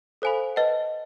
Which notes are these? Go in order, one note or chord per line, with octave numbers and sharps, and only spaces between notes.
A4 C5 F5 G#5 B5
B4 D#5 F#5 A5